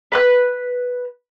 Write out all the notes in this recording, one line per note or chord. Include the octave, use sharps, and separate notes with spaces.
B4 B5 F#6